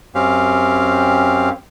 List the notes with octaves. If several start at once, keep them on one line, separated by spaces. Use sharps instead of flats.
F#2 C4 C#4 G4 F5